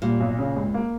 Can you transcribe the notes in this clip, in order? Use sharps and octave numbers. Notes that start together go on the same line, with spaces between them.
A#2 G3
B1
C#3
C#2
A#3